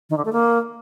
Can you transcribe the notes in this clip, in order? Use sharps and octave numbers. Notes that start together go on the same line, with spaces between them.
D#3
D3
A3
A#3